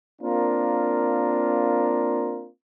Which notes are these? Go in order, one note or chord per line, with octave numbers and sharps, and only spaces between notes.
A#3 C4 D4 F4 A#4